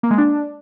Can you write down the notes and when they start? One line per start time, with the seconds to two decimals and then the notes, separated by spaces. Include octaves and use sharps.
0.03 A#3
0.11 G#3
0.18 D4